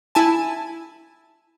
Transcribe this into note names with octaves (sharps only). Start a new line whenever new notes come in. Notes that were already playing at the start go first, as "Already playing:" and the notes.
E4 G#5 A5